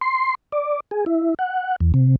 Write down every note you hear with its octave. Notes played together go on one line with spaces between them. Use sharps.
C6
D5
G#4
E4
F#5
E2
C3